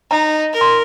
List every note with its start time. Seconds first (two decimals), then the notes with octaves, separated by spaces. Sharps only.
0.11 D#4 A#5
0.53 A#4
0.61 C6